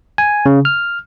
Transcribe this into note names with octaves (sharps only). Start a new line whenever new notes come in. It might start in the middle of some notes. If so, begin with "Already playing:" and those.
G#5
C#3
F6